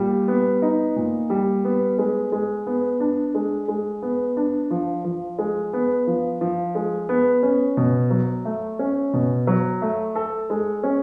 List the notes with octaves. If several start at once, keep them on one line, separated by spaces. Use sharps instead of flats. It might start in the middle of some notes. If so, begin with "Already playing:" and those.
Already playing: A#2 G3
B3
D#4
A#2
G3
B3
G#3
G#3
B3
D4
G#3
G#3
B3
D4
F3
F3
G#3
B3
F3
F3
G#3
B3
C#4
B2
F#3
A3
C#4
B2
F#3
A3
A4
G#3
C#4